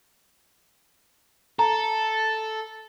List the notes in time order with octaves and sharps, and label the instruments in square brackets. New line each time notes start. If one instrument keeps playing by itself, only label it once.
[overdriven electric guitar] A4 [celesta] A#5